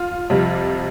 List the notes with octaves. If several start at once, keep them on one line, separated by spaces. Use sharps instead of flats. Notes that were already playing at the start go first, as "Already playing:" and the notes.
Already playing: F4
F2 C3 G3